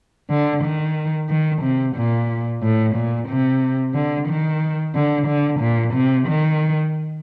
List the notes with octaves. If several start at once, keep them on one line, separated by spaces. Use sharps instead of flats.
D3
D#3
D#3
C3
A#2
A2
A#2
C3
D3
D#3
D3
D3
A#2
C3
D#3